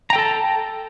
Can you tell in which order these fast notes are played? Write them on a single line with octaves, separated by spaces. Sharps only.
A#5 G5 A4 A5